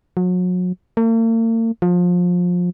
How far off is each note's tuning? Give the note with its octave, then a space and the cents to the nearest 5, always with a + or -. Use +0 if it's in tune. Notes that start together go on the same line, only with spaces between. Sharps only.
F#3 -35
A#3 -45
F3 +25